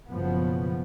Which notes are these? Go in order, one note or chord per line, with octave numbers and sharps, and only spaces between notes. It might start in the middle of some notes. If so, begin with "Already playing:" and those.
F#1 B2 F3 B3